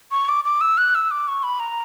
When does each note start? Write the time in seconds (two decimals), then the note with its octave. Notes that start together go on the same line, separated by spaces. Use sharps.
0.11 C#6
0.29 D6
0.45 D6
0.61 E6
0.78 F#6
0.95 E6
1.11 D6
1.28 C#6
1.43 B5
1.60 A#5